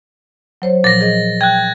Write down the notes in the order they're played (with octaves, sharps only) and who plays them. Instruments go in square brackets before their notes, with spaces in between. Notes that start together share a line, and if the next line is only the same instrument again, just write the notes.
[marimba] F#3 C5 C#5
[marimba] A#2 F3 F#3 [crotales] A6 A#6
[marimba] G#4 D#5
[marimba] G5 [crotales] F#6 G#6